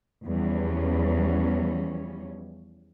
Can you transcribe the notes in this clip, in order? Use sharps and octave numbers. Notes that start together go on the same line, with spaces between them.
E2 F3 G3 C#4